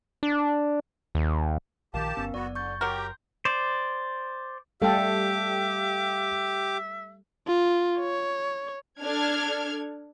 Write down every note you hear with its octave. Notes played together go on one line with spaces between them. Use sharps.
D4
D#2
A#1 D#3 G4 A#4 F5 A5
G1 B3 C#4
F#1 B3 F#4 D5
D3 C#6 G6 A6
F#3 G4 A#4 G5 C6 G6
C5 D5
G3 A3 G4 A4 E5 F5 G5 D6
F4
C#5
D4 A4 F6 G#6